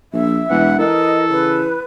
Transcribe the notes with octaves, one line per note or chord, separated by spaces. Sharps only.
A#1 E5
E1 E3 F#5
E3 A4 A#4 D#5
C#3 B4